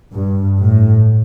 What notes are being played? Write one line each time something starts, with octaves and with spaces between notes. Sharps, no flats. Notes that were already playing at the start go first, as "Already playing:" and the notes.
G2
A2